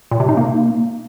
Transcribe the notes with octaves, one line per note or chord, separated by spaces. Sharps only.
A#2
C3
D#4
A#3